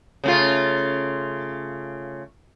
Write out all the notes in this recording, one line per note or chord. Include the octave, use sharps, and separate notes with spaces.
C#3 A3 F4